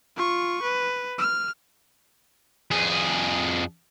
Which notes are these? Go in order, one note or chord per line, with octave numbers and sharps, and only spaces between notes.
F4 C#6
B4
F6
F2 G#4